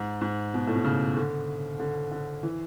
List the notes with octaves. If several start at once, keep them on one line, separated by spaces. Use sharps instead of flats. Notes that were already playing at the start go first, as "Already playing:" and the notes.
Already playing: G#2
G#2
B2
A2
B2
C#3
D3
D3
D3
E3